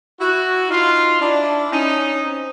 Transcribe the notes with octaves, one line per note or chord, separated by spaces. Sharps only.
E4 F#4
D#4 F4
D4 E4
C#4 D#4
C4